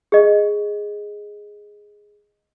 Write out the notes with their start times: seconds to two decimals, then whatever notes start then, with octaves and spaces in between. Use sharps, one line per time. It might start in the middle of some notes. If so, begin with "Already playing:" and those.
0.12 G#4 D#5